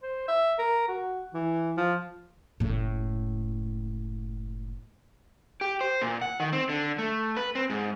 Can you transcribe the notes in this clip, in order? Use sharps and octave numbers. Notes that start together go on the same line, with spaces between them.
C5
E5
A#4
F#4
E3
F3
F#1 A2
G4
C5
A#2
F#5
D#3
C4
D3
A3
B4
C4
G#2